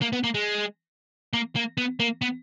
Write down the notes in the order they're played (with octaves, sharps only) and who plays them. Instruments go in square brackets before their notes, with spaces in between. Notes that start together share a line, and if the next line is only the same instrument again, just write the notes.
[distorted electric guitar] A#3
B3
A#3
G#3
A#3
A#3
B3
A#3
B3